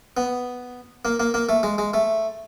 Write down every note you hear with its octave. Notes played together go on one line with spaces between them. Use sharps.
B3
A#3
A#3
A#3
A3
G#3
G#3
A3